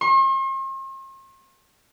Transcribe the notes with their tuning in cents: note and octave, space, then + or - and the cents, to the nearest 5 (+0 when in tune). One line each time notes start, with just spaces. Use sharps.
C6 +45